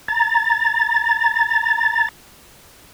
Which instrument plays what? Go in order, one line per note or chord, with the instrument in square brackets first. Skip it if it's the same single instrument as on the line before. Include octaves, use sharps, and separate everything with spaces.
[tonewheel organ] A#5 A6